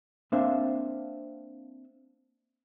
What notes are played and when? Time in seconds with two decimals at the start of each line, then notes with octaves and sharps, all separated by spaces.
0.32 A#3 C4 D4 C5 E5 F5